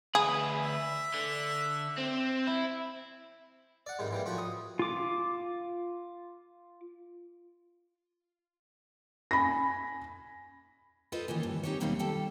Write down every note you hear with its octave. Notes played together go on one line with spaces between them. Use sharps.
D2 G#4 B4
E5
D3
C4
E4
D5 F#5
G#2 C3 D#3 G3
E3 G3 A#3
A2 F3 F#4 G5 C#6
D#6
F4 D6
G#5 B5 A#6
F4 A4 B4 C5 D#5
D#3 E3 A#3 C#4
G2
C4 D#4 G4 C5 C#5
D#2 B2 G3 C4 D#4 F5
G3 A4 G5 A5